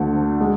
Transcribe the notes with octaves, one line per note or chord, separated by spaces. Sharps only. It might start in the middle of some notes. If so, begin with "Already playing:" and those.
Already playing: D2 D3 A3
G#3